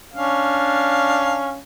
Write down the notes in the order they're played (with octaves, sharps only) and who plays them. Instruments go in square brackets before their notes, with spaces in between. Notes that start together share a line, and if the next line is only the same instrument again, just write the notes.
[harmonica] C#4 D4 F5